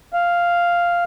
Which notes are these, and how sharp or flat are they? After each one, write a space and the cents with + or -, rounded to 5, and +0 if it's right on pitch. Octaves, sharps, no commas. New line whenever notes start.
F5 -5